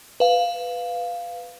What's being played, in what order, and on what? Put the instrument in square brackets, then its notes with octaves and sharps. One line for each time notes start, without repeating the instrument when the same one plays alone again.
[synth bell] B4 F5